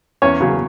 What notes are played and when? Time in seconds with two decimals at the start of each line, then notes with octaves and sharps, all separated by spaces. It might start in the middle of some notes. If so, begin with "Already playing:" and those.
0.22 E2 C#4 C#5
0.41 C#3 F#3